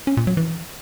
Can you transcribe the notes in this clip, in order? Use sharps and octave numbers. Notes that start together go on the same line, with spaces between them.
C#4
A#2
F#3
E3